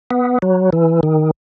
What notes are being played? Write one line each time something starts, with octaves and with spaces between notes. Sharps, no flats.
B3
F#3
E3
D#3